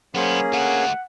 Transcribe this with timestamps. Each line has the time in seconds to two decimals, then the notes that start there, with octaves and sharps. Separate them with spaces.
0.15 F#2 A#3 B3 C#4 G#4 C5
0.53 A3 F#4 F#5